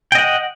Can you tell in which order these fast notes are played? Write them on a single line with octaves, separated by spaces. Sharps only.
G5 D#5 F#5